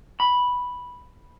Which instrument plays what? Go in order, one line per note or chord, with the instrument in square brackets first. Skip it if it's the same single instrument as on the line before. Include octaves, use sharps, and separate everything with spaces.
[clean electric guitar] B5